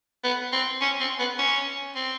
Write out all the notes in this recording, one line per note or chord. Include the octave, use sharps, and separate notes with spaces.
B3
C4
C#4
C4
B3
C#4
C4